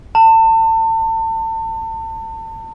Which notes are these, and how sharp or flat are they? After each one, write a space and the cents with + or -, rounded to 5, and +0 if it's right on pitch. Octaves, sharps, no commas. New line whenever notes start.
A5 +35